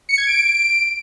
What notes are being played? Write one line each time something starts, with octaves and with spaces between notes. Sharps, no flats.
C#7
G#6
D7